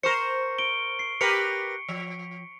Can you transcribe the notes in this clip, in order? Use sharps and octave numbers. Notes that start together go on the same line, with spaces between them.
A#4 C5 C#6 C#7
D7 G7
C7
G4 A#4 B4 C#7
F3